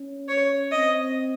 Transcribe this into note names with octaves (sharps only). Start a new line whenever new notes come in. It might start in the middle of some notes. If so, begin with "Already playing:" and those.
Already playing: C#4
C#5
C4 D#5